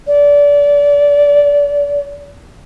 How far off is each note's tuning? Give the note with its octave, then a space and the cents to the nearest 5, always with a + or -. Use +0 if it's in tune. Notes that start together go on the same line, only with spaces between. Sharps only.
D5 -25